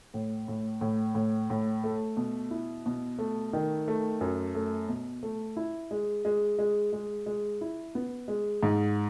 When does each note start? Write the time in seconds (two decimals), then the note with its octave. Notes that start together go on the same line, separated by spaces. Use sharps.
0.14 A2
0.48 A2
0.81 A2
1.15 A2
1.50 A2
1.84 A3
2.17 B2
2.51 E4
2.86 B2
3.19 A3
3.53 D#3
3.88 A3
4.21 F#2
4.55 A3
4.88 B2
5.23 A3
5.56 E4
5.91 G#3
6.25 G#3
6.58 G#3
6.93 G#3
7.26 G#3
7.61 E4
7.95 B3
8.28 G#3
8.63 G#2